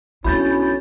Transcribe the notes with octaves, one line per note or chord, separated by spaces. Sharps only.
B1 C#4 D4 E4 F#4 B5 G6 A6